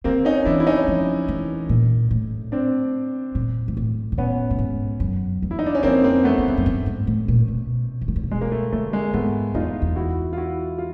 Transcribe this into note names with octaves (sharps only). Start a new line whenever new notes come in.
D#3 A#3 C4
C#4 D#4
E3 D4 E4
E4
C#4 D#4
F3
E3
A#2
A2
C4 D4
A#2
G#2
A2
B2
A#2 B3 C#4
A2
G#2
F#2
E2
E4
D#4
D4
C#4
F2 A#3 C4
A#3 C4
A3 B3
E2
F2
F#2
G2
G#2
A2
A#2
B2
D#3
D3
C#3
C3
B2 G#3
A#3
A3
D3 A3
G#3 A#3
G#2 A3 B3
E2 D#4 F4
E2
E4 F#4
F4
E4 F#4
F4